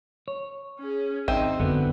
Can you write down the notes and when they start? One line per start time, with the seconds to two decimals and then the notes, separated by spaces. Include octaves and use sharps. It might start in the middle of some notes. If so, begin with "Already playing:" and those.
0.28 C#5
0.79 C#4 G#4
1.28 G#1 C4 D#4 D#5 E5
1.60 F2 D3 B3 D4 F#4